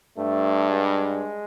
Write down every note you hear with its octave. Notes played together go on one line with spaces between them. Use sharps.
G2 A3
G#3